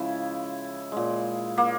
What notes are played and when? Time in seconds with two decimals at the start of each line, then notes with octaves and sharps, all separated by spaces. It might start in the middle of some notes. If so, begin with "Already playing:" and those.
Already playing: C#3 F3 G#3 E4
0.92 A#2 G#3
1.58 A#3